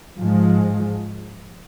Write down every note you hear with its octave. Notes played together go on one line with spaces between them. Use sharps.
G#2 F3 G#3